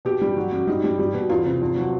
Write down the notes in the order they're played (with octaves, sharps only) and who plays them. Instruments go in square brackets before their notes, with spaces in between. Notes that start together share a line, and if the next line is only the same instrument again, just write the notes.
[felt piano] B2 G4
G3
F#3
F#2
G3 D#4
G3
G3
B2
E2 F4
C3
F2
F#3